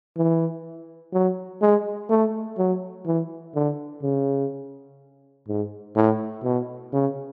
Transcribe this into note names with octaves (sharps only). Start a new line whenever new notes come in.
E3
F#3
G#3
A3
F#3
E3
D3
C#3
G#2
A2
B2
C#3